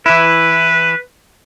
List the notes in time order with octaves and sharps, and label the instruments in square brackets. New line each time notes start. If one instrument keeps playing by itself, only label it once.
[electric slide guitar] E3 E4 [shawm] B4